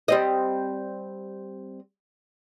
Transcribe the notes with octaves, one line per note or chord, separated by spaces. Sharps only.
G3 C4 D#5